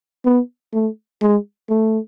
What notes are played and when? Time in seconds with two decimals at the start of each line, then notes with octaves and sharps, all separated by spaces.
0.25 B3
0.73 A3
1.21 G#3
1.70 A3